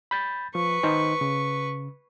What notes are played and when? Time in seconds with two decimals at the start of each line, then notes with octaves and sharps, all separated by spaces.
0.11 B5 G6 A6
0.55 F3 B4 C#6
0.83 D#3 D#4 C5
1.21 C#3